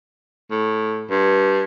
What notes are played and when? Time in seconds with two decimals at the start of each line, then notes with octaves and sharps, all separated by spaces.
0.51 A2
1.10 G2